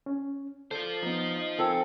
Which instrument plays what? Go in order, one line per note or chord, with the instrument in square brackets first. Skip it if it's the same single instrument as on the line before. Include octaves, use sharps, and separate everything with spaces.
[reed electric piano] C#4
[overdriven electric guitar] F4 C5 [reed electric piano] A4 [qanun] D5
[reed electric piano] F3 B3 [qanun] D#4
[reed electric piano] D#5
[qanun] F3 [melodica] C4 A4 [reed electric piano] A#4 G#5 E6